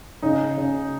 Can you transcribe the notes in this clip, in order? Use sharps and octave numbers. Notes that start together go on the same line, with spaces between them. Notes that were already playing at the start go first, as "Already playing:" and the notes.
C#3 D#4
C#3